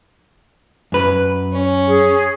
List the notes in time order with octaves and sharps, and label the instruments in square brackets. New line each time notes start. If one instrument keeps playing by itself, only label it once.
[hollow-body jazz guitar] F#2 B4
[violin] C#4
[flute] G#4